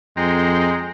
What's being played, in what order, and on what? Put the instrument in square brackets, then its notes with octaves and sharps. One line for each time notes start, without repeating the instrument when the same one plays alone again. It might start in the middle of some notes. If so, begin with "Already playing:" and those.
[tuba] F2 [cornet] G#3 [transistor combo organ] G5 A#5 C6